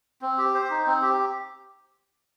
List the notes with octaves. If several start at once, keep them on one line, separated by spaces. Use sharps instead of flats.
C4
G4
C5
D#4
C4
G4